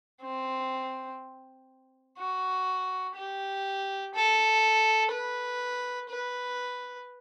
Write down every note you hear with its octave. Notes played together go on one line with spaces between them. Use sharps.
C4
F#4
G4
A4
B4
B4